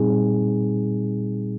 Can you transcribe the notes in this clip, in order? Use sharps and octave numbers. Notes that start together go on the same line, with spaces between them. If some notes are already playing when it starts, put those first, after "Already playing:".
Already playing: A#2 G3 C4 D#4 G#4